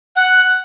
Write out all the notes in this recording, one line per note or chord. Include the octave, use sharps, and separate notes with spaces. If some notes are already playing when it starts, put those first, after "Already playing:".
F#5